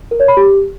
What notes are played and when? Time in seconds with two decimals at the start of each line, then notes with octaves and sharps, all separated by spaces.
0.11 A#4
0.20 C#5
0.28 B5
0.37 G4